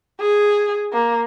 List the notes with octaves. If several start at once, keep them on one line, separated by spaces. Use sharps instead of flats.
G#4
A#3